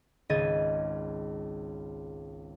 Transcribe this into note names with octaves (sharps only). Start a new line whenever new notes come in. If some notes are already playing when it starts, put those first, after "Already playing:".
G#1 C#2 D#5 G#6 A6 D#7